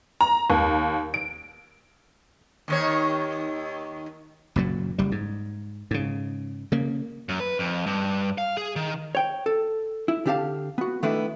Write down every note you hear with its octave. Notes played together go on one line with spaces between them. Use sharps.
A#5
D#2
D7
D#2 D#3 C#5
F#1 A#2 F#3
F#1 G3
G#2
G#2 C#3
C#3 A#3
F#2
B4
F2
G2
F5
G#4
D#3
C#5 G5
A4
E4
D3 D4 G4 G#4 F5 A5
B3 F#4
D#3 A3 B3 D4 E4